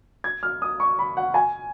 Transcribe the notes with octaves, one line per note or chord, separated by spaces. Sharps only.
G#6
F6
D#6
C#6
B5
F#5
G#5